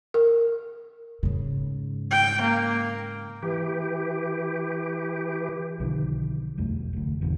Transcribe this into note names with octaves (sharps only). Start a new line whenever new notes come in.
A#4
G#2 C#3
G5
A#3
E3 G4
B1 D3 D#3 F3
E1 B1 F2 A3
F1 D2
G1 E2 G#2 C3